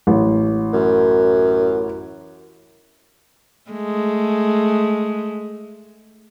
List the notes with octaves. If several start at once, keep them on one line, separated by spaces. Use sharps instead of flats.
A1
F#2
G#3 A3